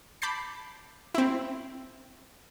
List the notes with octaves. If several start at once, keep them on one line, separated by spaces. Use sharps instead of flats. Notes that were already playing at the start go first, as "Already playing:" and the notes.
A5 B5 D6 G6 A6 C7
C4 E4